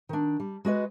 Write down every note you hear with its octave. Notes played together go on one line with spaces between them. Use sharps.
D#3 D4
G3
G#3 F#4 B4 D#5